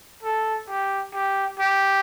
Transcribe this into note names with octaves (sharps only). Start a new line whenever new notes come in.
A4
G4
G4
G4